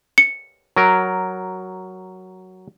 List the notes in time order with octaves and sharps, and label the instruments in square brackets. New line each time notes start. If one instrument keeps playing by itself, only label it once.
[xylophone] C#7
[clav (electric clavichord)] F#3 A#4